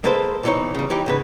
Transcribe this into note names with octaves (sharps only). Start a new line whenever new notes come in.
G#3 A#3 A4 B4 C5
B1 A#2 E3 G3 D#4 C#5
C#3 G3
E3 D#4 G4
G#2 C#3 B4